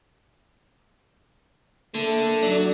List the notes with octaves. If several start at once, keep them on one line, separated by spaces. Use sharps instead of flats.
D3 A3 A#3
F#3 D4 A4 D5